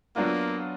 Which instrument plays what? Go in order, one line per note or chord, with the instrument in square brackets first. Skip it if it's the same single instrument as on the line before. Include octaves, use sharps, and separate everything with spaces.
[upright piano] F#3 B3 D4 F4 [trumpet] A#3